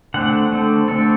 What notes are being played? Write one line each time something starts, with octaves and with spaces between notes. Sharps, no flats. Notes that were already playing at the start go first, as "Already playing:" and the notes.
D3 A3 C4 F#5
D3 A3 C4
D3 A3 C4 A4